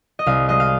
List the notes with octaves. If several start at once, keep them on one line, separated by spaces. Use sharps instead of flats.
D#5
C2 F5
G#3 D#5
F5